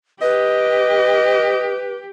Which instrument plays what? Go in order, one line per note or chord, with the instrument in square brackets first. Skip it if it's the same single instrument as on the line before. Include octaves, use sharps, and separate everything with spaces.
[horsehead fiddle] G4 [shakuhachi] B4 [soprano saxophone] D#5